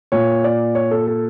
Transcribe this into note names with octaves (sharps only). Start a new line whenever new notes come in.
A#2 C#5
D5
C#5
A4
A4